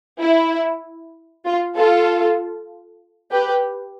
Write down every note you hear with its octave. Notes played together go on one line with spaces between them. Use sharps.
E4
F4
F4 A4
G4 B4